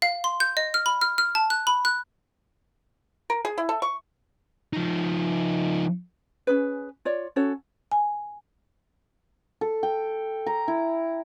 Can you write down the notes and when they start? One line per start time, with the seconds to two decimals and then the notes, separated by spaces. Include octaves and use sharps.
0.02 F5
0.24 C6
0.40 G6
0.57 D#5
0.74 F6
0.86 B5
1.01 F6
1.18 F6
1.35 A5
1.50 F#6
1.67 B5
1.85 F#6
3.30 A#4
3.45 G#4
3.58 E4
3.69 A4
3.82 C#6
4.73 F3 D#4
6.47 C#4 D4 G#4 B4
7.05 F4 C#5 D5
7.36 C#4 F#4 A4 C#5
7.92 G#5
9.61 A4
9.83 G5
10.47 A#5
10.68 E4